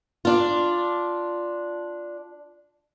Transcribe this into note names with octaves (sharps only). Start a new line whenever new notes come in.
D4 F4